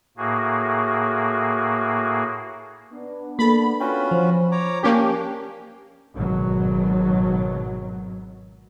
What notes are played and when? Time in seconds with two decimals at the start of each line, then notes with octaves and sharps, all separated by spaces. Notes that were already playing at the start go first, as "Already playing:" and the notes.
0.17 A2 A#3 F#4 G#4
2.93 B3 D4
3.39 A#3 A4 B5
3.80 C#4 F4 F#4 G5
4.11 F3 C5
4.52 C#5 A#5 D6
4.83 A#3 C#4 D4 G4
6.17 G#1 B2 F#3